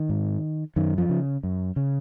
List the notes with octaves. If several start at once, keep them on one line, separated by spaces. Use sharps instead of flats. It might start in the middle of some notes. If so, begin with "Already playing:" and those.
Already playing: D#3
G#2
F#2 D#3
F3
C#3
F#2
C#3